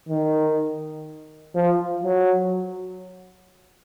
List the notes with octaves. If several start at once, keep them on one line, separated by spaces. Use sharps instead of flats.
D#3
F3
F#3